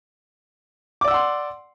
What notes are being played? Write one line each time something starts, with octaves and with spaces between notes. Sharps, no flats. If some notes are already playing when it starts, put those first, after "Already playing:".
D5 F#5 C6 D6 E6